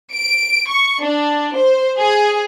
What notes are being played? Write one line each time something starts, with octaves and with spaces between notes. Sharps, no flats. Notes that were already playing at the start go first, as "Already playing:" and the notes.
D7
C#6
D4
C5
G#4